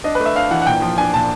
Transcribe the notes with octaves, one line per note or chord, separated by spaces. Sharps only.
D4 D#5
A3 B4
E5
D4 F5
E3 F#5
F#5
A#2 G5
F3
D4 G#5
A#2 A5